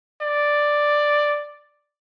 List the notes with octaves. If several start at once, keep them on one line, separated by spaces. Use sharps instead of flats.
D5